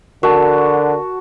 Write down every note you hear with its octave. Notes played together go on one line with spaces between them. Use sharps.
D3 F#4 A#4 A5